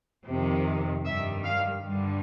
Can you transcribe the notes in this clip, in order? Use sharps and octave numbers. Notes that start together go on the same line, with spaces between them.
F2 C3 D#3
G2 D#3 G3 E5
F5
G2 D3 G3